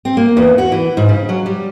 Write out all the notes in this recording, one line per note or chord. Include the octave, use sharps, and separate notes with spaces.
C4
A#3
E2
F#4
E3
G#2
C#3
F#3
G3